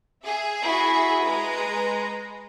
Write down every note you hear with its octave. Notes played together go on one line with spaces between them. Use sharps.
G#4 E5
E4 F#4
G#3 B4 A#5